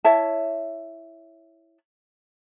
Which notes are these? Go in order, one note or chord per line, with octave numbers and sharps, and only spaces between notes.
E4 C#5 E5 A5